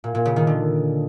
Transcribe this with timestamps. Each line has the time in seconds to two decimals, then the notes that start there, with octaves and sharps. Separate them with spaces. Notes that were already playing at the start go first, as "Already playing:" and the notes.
0.04 A#2
0.15 A#2
0.25 C#3
0.36 D#3
0.47 D3